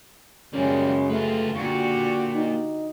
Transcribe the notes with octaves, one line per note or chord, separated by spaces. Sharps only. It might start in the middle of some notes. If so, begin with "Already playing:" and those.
F#2 C#3 G3 G#3 A#3 C#4
A3 F4 B4
A#2 D3 F#4 G4 C#6
D#4